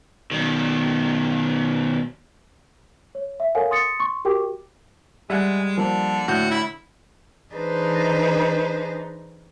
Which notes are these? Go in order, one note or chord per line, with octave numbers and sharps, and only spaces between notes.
B2 D#3
C#5
E5
A4 A#4 C#5 F5 F#5 G#5
C6 D#6 A6 C#7
C6 C#6
F#4 G4 A#4 G5 D6
G3 G#3 E5 F#5 G#5
D3 F3 A#3
A2 D3 F#4 G6
E4
E3 D4 D#4 G#4 B4 C5